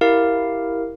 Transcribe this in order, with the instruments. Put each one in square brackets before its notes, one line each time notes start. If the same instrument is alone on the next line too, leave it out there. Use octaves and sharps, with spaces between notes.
[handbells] E4 G4 A#4 F5